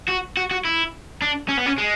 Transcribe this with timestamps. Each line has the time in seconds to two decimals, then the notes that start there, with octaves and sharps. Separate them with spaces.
0.08 F#4
0.37 F#4
0.51 F#4
0.65 E4
1.22 D4
1.49 C#4
1.57 B3
1.66 C#4
1.78 G#3